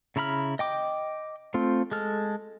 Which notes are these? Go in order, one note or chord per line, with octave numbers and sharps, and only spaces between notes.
C#3 E4 A#5 B5 F6
D#5 G5 D6
A3 C4 F4
G#3 A4 F6